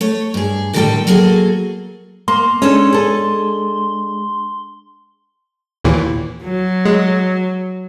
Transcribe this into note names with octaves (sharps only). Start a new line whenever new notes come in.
A3 C#5
G2 G#4
A2 D3 D#3 G3 A4 G5
F#3 A#3 F#4 G#4 A4
A#3 C6
G#3 C#4 D4 A4
G#4 A4
D#2 A#2 E3
F#3
G#3